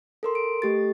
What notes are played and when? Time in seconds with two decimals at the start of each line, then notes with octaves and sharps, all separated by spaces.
0.23 A4 A#4 C6
0.35 D7
0.62 A3 G4 A4 A6